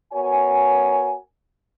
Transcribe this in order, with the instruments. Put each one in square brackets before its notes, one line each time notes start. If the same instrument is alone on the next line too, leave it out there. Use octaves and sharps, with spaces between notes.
[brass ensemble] B3 F#4 A#4 C#5 G#5